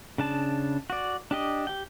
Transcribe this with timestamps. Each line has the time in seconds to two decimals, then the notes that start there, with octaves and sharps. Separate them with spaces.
0.18 C#3 D4 A5
0.90 F#4 D5
1.31 D4 G4 D#5
1.67 G4 G5